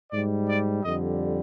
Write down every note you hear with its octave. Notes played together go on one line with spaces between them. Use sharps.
G#2 G3 D5
D5
F2 D3 G3 D#5